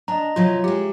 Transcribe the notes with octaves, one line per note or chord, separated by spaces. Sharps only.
D4 D#5 A#5
C3 F3 F#3 F4 C#5 A#5
G#3 E4 G4